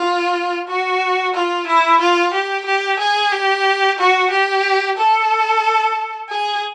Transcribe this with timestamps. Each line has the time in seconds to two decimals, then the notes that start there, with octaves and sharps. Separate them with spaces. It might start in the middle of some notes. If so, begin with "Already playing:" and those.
Already playing: F4
0.68 F#4
1.34 F4
1.67 E4
2.00 F4
2.33 G4
2.66 G4
2.99 G#4
3.32 G4
3.98 F#4
4.30 G4
4.97 A4
6.29 G#4